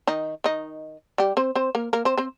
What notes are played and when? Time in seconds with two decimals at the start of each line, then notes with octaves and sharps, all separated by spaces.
0.07 D#3 D#4
0.44 D#3 D#4
1.18 G3 G4
1.37 C4 C5
1.55 C4 C5
1.75 A#3 A#4
1.93 A#3 A#4
2.05 C4 C5
2.18 C4 C5